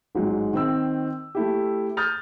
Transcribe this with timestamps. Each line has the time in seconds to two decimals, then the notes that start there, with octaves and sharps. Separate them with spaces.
0.15 A1 G#2 F#3 G#3
0.53 D#3 C4 E6
1.35 A3 E4 G4
1.97 D#6 F6 G6 A6 F7